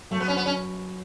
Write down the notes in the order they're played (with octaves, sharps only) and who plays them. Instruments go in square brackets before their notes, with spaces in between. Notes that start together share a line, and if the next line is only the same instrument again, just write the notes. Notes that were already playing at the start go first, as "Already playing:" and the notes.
[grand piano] F#2 [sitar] A3
[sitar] B3
C#4
B3
C#4